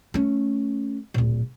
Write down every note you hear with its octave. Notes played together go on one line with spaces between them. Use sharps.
A3 C#4
D1 A#2